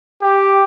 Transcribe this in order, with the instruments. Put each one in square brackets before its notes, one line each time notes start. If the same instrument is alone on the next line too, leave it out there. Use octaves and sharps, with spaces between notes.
[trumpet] G4